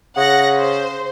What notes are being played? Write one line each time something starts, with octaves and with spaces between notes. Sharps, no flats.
C#3 F#5 A#6
C5